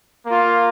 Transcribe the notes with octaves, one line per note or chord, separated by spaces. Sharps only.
A#3 F4